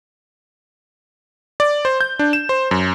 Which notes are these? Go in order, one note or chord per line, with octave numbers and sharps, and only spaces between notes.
D5
C5
G6
D4
E7
C5
F#2